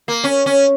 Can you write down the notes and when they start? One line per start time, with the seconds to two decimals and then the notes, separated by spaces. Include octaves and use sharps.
0.08 A#3
0.24 C#4
0.46 C#4